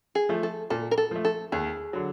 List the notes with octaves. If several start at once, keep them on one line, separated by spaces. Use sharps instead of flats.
G#4
F3 A3
A4
A#2 A4
A#4
A4
F3 A3
A4
D#2 G#4
D3 F#3